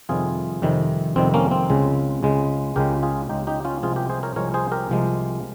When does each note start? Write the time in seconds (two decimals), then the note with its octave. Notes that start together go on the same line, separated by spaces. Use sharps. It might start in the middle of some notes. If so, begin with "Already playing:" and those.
0.09 F2 C3 D#3 G3 F4 G#4
0.62 F2 C3 D#3 G3
1.16 F2 C3 D#3 G3 C4
1.34 A#3 C#4
1.51 C4
1.70 C#2 C#3 G#3
2.23 C#2 C#3 G#3
2.76 C#2 C#3 G#3 G4 A#4
3.03 F4 G#4
3.29 C#2 C#3 G#3 D#4 G4
3.47 D#4 G4
3.65 C#4 F4
3.83 C2 C3 F3 G#3 F4 G#4
3.96 G4 A#4
4.10 G#4 C5
4.23 A#4 C#5
4.36 C2 C3 F3 G#3 A#4 C#5
4.54 G#4 C5
4.72 G4 A#4
4.90 C2 C3 F3 G#3